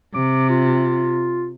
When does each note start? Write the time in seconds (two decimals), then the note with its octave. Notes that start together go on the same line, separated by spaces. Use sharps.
0.14 C3 D6
0.49 F4